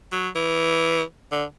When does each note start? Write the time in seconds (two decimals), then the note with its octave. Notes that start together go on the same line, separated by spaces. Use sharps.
0.12 F#3
0.36 E3
1.32 D3